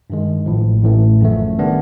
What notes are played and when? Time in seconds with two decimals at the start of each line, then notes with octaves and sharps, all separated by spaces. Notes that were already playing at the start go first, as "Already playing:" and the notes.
0.10 G2 D#3 G#3
0.46 A1 A2 F3
0.84 A1 A2 E3 A3
1.21 F#2 C#3 F3 A3
1.58 D#3 G3 B3 D4